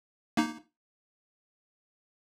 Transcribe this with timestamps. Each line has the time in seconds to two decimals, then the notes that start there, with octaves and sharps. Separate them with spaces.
0.37 A#3 D#4